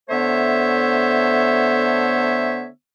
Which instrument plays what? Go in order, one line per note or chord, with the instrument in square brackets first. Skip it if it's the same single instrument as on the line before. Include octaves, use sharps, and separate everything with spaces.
[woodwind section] D3 A3 B3 C5 C#5 E5